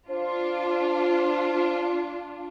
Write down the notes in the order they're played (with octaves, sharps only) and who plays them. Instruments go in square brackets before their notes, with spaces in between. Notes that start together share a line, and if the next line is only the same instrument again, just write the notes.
[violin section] D4 F4 [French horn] C5